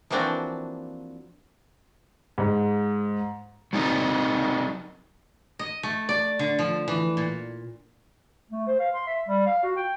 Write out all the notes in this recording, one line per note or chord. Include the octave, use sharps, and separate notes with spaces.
E3 F3 A#3 C4 D4 F#4
G#2
F#3 C4 D#4 A#4
D#5
A3
D5
D3
F3
E3
A#2
A3
C5
F5
C6
E5
G3
F5
F#4
G5